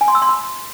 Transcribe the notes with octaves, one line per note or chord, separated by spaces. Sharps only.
G#5
C6
E6
C6
B5